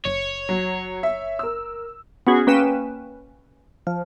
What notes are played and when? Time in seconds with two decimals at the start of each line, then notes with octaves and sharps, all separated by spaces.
0.05 F#1 C#5
0.49 F#3
1.03 E5
1.39 A#4 E6
2.27 B3 C#4 F#4 G#4
2.47 A#3 C#4 B4 G5 E7
3.87 F3